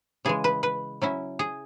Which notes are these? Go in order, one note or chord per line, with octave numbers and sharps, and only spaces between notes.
C#3 E3 G#3 G#4
B4
B4
F#3 C#4 E4
G#4